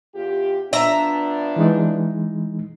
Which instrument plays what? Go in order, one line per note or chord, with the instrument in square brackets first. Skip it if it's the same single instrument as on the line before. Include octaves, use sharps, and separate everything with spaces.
[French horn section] E2 F4 G4
[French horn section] F3 B3 D4 [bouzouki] E5 A#5
[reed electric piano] E3 G#3 D#4